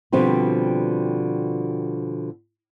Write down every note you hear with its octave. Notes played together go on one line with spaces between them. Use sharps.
B2 D3 F3 G3 C4